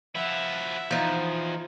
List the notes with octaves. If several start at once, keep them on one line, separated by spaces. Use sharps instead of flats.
F3 E4 E5 F#5
E2 F3 D#4